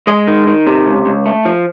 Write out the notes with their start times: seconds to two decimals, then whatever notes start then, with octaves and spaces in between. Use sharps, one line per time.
0.07 G#3 D#5
0.27 D#3
0.47 D#3
0.67 C3
0.86 C#2
1.06 C#2
1.26 A3
1.45 F3